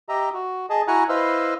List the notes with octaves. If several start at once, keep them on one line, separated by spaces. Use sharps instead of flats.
G4 D#5 E5 A#5
F#4
G#4 D#5 A5
E4 F#4 F#5 G#5 A#5 F#6
E4 B4 C5 D#5 F5 E6